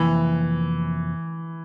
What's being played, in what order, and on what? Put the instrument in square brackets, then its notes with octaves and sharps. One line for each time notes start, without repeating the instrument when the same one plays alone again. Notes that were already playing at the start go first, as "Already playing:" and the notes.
Already playing: [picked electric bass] F2 C3 F3 A#3 [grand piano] E3